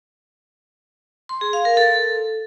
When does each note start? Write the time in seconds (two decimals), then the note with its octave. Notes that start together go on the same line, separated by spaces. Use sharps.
1.29 C6
1.41 G#4
1.53 F5
1.65 A#4
1.77 A4